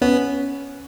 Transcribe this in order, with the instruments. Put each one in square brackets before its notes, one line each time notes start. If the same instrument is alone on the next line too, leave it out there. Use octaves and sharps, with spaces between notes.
[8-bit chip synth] B3 [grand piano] C#4